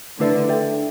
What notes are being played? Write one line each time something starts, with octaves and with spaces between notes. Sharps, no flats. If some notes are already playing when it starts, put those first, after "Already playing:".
D3 A3 E4 B4 E5
D4 A4 E5 G5